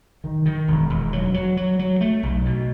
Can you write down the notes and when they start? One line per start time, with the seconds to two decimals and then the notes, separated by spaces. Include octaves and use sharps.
0.24 D#3
0.46 D#3
0.68 E1
0.90 E1
1.13 F#3
1.34 F#3
1.57 F#3
1.79 F#3
2.01 A3
2.23 B1
2.46 B2